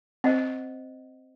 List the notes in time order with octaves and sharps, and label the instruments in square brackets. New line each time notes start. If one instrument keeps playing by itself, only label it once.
[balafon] C4 [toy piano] C5 D#5 F#5